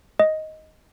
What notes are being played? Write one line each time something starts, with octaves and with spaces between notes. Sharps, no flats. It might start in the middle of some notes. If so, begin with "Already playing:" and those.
D#5